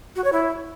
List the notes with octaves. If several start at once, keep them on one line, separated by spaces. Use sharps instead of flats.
F#4
C#5
E4